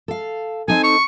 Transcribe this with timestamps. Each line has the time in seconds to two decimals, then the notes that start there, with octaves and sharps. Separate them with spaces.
0.08 A4 F5
0.68 C4 D#4 A4 G#5
0.84 C#6